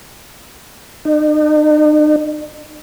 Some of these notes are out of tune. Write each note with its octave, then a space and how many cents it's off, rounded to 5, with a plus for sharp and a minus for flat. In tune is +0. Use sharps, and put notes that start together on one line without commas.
D#4 -45